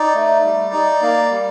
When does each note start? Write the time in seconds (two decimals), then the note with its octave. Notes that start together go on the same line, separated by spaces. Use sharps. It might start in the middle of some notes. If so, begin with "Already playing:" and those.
Already playing: D#4 D5
0.15 A3
0.44 G3
0.72 D#4
1.02 A#3
1.31 G3